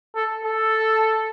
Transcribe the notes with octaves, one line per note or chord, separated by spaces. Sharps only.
A4
A4